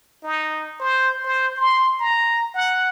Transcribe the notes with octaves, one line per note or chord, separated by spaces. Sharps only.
D#4
C5
C5
C6
A#5
F#5